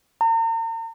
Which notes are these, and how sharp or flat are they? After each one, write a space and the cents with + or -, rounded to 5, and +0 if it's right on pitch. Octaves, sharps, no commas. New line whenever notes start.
A#5 -40